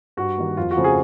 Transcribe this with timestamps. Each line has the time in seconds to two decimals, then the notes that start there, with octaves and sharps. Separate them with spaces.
0.17 G2 F#4
0.37 D#3 G3 A#3
0.57 F2 F4
0.71 F#4
0.77 C#3 F3 A3 C4
0.84 G#4